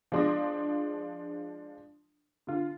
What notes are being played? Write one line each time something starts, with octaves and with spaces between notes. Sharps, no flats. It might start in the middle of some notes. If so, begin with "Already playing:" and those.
F3 G#3 D4 C6 D#6 A#6
D3 F4